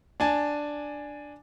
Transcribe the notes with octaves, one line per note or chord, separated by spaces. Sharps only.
D4 G#5 A5